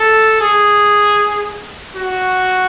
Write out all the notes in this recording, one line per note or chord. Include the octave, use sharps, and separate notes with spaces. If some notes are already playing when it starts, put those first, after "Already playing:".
Already playing: A4
G#4
F#4